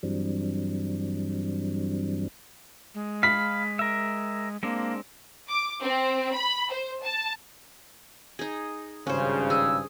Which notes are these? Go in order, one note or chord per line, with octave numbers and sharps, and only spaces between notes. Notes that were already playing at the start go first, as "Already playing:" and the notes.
G2 E3 F#3 G3 C4 D4
G#3
F5 B5 B6
A#4 E5
G#3 A#3 C4 D4
D6
C4
B5
C5
A5
D#4 G#4
G#1 G2 C#3 C#4 C5
G#4 E6